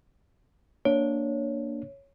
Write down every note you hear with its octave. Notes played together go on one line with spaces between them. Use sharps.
A#3 D4 C#5